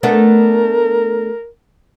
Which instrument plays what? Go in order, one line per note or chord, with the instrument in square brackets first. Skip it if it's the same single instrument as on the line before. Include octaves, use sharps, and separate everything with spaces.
[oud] A3 B3 D4 [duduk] A#4